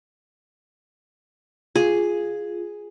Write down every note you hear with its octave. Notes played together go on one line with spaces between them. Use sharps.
F4 G#4